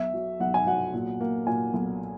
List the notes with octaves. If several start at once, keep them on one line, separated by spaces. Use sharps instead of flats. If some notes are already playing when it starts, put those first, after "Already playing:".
Already playing: B1 E5
F#3
B1 F#5
G#5
F#3 F#5
A#2
A#3
A#2 G#5
B1